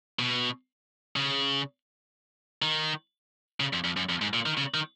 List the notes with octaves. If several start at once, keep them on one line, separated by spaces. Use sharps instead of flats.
B2
C#3
D#3
C#3
F2
F2
F#2
F2
G#2
A#2
D#3
C#3
D#3